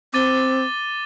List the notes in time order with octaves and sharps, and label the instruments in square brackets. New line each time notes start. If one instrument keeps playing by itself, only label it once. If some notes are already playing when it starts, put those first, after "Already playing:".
[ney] C4 [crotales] D6 A6 D#7 G7